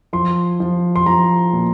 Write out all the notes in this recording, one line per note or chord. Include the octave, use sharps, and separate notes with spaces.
F3 C6
F3
C6
F3 A#5
A#2